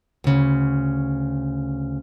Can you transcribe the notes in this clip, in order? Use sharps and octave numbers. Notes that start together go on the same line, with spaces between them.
D2 C#3